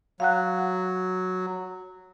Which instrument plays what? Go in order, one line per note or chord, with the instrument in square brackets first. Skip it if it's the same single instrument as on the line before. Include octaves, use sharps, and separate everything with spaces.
[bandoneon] F#3 [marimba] F5 F#5 F#6